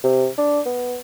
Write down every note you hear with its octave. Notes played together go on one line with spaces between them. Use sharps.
C3
D4
B3